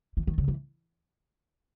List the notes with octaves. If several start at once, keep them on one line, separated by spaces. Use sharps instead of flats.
E3
D#3
C#3
E3